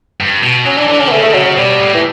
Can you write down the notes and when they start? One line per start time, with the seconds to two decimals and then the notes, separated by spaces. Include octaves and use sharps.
0.20 G2
0.43 B2
0.66 F#3 C#4
0.77 E3 D4
0.88 E3 D4
1.00 D3 C#4
1.08 B3
1.12 C#3 A3
1.23 A3
1.34 C#3 F#3
1.45 F#3
1.57 B2 G3
1.80 A2
1.94 E3